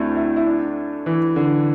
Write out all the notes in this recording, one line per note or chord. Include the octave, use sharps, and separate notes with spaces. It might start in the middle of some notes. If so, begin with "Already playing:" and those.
Already playing: D2 A3 C4 D4 E4
E4
E4
D4
E3
D3